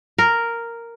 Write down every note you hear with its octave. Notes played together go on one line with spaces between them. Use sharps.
A#4